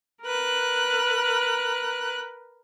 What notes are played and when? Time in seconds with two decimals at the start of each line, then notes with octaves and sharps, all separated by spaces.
0.23 A#4 B4 F#6